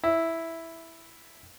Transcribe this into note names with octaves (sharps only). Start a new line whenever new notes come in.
E4